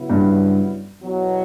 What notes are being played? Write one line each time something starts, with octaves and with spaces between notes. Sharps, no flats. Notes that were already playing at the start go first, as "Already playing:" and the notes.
Already playing: C#3 F#3 B3 E4
G2
E2 B2 F#3